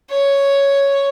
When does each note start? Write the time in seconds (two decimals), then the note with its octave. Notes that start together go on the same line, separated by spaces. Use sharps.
0.10 C#5